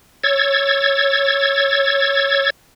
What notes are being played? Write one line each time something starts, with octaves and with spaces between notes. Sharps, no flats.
C#5 E6 G#6 A6